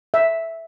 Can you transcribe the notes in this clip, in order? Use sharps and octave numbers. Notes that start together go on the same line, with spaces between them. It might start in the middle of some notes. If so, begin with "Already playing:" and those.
E5